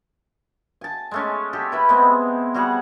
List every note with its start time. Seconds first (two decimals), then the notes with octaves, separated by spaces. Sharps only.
0.81 G#5 A5
1.11 G#3 A3 C#4
1.53 G4 A4
1.72 E4 B4 E5
1.89 G#3 B3 C4
2.54 G3 F#4 G#4 F#5